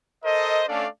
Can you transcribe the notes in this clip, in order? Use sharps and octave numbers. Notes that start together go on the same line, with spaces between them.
A4 A#4 C5 D#5
A3 C#4 D4 A4 D5 F5